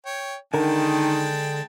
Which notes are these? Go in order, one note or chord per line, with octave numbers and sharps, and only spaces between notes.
C#5 G5
D3 D#3 G#3 A#4 G5 A5